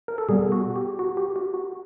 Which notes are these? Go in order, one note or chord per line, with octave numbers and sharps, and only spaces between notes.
A#4
A4
B2 G3 B3 G#4
F#4
G4
F#4
G4
F#4
F#4